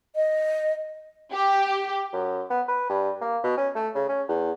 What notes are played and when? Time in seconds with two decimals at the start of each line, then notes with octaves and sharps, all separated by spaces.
0.16 D#5
1.33 G4
2.13 F#2
2.50 B3
2.68 B4
2.89 G2
3.21 A#3
3.44 B2
3.57 C#4
3.75 A3
3.95 C#3
4.09 C#4
4.28 E2